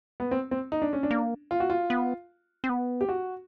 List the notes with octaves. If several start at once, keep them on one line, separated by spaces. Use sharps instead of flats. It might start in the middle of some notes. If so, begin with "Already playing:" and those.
B3
C4
C4
D#4
D4
C#4
D4
A#3
F4
F#4
F4
B3
C4
B3
G4
F#4